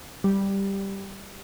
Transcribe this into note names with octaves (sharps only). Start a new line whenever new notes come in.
G3